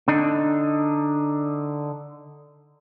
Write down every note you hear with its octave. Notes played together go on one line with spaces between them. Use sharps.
D3 D4 D#4